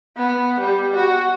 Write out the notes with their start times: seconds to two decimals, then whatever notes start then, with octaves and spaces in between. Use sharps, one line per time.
0.17 B3
0.60 G3
0.96 F#4